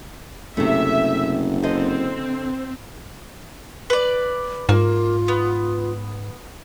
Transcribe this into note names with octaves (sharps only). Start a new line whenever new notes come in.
F#1 C3 A3 E5
D3 C4 C5 D#5
B4 D5
G#2 A#3 F4
B3